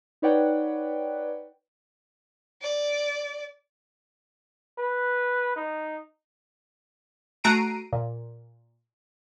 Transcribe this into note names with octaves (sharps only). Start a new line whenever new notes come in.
D#4 B4 C#5 D5 F#5 G5
D5
B4
D#4
A3 F#4 A#5 C7 D7 D#7
A#2